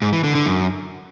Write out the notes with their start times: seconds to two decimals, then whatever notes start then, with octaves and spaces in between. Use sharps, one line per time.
0.02 G#2
0.13 E3
0.24 D3
0.35 D3
0.46 F#2